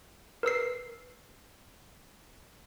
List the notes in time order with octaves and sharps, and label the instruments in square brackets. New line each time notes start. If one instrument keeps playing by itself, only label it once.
[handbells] A#4 B4 E6 C7